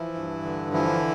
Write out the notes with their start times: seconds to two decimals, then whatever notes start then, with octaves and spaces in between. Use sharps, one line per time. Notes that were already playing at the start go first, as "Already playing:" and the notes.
Already playing: E3 F3 E4
0.14 G2
0.43 D3
0.72 E3 F3 E4